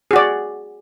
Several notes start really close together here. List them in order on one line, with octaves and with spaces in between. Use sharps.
G#4 F#4 D5